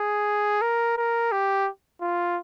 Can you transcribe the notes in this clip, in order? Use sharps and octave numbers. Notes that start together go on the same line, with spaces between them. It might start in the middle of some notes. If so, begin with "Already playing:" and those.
Already playing: G#4
A#4
A#4
G4
F4